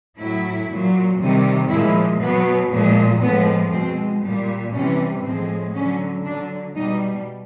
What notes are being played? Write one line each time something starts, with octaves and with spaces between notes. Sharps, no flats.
A2 F#3 E4
A#2 F#3
C3 D#3 G3
A#2 F3 G#3 E4
B2 F#3 B3
A#2 F3 G#3
A2 F3 G#3 B3
B2 G#3 C4
A#2 G3
C3 E3 G3 C#4
A2 F3 G#3 C4
D3 F#3 C#4
D3 F#3 D4
B2 G3 D#4